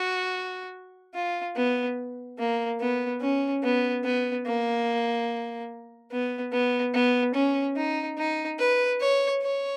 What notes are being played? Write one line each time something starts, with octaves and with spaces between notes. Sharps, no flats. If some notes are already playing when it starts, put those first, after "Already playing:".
Already playing: F#4
F4
B3
A#3
B3
C#4
B3
B3
A#3
B3
B3
B3
C#4
D#4
D#4
B4
C#5
C#5